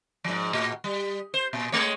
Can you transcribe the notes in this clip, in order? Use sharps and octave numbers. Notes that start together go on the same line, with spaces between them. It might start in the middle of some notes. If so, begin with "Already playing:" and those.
G#2 F3
A2 F#4
G3
C5
A#2
G#3 A3 C#5